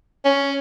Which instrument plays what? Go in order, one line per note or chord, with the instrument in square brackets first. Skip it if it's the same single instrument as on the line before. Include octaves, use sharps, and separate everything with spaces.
[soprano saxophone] C#4